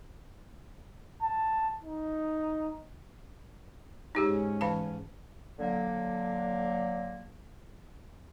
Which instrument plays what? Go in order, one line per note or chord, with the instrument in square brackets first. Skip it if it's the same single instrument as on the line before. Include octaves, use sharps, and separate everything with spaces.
[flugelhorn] A5
D#4
[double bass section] G#2 C#4 [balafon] D#4 G4 G#4
[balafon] E3 F5 A5
[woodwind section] D3 F#3 A#3